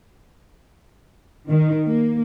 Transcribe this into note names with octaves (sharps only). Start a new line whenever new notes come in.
D#3
A#3